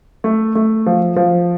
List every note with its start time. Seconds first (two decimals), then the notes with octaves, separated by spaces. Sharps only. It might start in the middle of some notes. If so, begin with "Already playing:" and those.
0.24 A3
0.55 A3
0.86 F3
1.16 F3